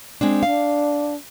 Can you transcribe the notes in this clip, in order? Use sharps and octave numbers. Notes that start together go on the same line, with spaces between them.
G#3 C4 D4
D4 F5